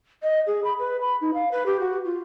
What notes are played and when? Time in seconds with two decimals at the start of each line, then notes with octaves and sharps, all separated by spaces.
0.23 D#5
0.47 G#4
0.64 B5
0.79 B4
1.01 B5
1.21 D#4
1.34 F5
1.52 B4
1.66 G4
1.80 F#4
2.05 F4